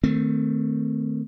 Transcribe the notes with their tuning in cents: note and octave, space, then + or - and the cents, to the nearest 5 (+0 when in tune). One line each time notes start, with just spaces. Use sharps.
D#3 +0 A3 +15 C4 -15